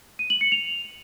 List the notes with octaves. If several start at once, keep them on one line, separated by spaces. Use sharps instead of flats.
D#7
F#7
C#7
F7